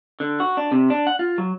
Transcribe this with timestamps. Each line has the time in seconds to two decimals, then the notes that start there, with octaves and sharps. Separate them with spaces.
0.20 D3
0.40 F#4
0.57 D4
0.71 C3
0.90 D4
1.07 F#5
1.19 F4
1.38 F#3